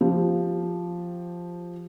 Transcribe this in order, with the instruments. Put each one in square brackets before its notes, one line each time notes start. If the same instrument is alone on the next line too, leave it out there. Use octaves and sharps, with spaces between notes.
[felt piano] F3 G4